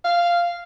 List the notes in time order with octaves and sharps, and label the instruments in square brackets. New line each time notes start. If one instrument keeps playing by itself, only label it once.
[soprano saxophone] F5